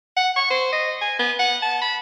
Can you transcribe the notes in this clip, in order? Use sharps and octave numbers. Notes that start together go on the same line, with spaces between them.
F#5
C#6
C5
D#5
G#5
B3
F#5
A5
B5